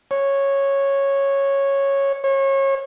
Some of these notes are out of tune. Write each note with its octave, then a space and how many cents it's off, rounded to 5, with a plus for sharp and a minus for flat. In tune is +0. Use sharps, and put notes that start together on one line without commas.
C#5 -10
C#5 -30